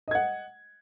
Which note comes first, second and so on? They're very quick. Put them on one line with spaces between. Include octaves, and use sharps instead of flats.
D#5 G#6 F#5